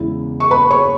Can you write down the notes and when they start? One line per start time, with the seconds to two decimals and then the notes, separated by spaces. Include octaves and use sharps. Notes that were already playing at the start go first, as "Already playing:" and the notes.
Already playing: E2 C#3 G#3 E4
0.40 C#6
0.51 B4 B5
0.70 C#5 C#6